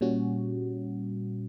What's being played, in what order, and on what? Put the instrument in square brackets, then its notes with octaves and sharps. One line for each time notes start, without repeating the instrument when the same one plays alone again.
[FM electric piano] A#2 G3 C#4 F#4